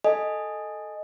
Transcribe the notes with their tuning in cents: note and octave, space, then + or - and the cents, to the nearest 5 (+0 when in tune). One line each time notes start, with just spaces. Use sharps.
A4 +0 D#5 +0 G#5 +0